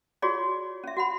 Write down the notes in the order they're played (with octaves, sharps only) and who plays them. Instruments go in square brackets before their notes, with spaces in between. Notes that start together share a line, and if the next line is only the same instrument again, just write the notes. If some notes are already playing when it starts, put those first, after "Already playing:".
[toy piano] F4 F#4 G#4 C#5 D5
C#4 E5
F#4 F#5 B5